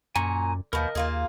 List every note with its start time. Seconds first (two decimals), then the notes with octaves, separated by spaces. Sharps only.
0.16 F#2 A#2 G#5 A#5 C#6
0.73 D#2 B2 F3 A#4 D#5
0.95 D#2 A#3 F4 G#4